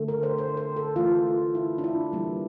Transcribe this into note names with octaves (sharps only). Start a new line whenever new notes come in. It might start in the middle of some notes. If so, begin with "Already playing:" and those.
Already playing: D3 A3
A#4
C5
C5
C5
A4
E3 A3 F4
E4
D4
E4
E3 G3 A#3